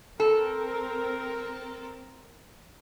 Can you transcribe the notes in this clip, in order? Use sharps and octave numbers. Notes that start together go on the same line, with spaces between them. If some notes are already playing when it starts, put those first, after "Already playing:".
C4 A4 A#4